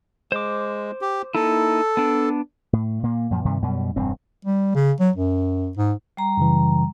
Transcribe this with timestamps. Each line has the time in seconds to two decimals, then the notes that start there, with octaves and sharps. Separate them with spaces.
0.32 G#3 C5 D6
1.01 G4
1.35 A#3 D#4 E4 A4
1.97 B3 D4
2.73 A2
3.03 A#2 A#3
3.31 F#2 A#2 F3
3.45 G2 C3 D#3 G3
3.62 F#2 B2 G3
3.96 E1 G2 C4
4.45 G3
4.75 C#3
5.00 F#3
5.16 F#2
5.77 G#2
6.17 G3 A#5
6.37 F#2 C#3 E3